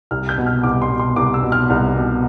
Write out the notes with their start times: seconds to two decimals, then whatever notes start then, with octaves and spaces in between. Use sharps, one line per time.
0.11 C2 F6
0.29 G6
0.38 B2
0.46 F6
0.63 C2 D6
0.82 C6
0.91 B2
0.99 C6
1.16 C2 D6
1.34 E6
1.43 B2
1.52 F6
1.70 C2
1.96 B2